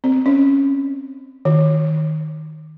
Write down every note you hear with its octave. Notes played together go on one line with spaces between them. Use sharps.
C4
C#4
D#3